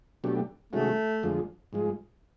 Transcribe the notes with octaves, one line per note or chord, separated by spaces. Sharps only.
B2 F#3 A3 D4 G4
C3 D#3 G#3 A3 C#4 F#4
F2 D3 F3 G#3
G#2 F3 G#3